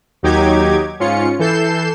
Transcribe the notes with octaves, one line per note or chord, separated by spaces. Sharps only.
D#2 F#3 D#4 G4 D6 G#6
G#2 C#4 F4 C#7
E3 A4 G6 C7 E7